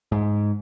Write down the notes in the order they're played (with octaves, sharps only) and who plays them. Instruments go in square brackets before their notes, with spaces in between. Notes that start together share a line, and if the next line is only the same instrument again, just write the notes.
[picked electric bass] G#2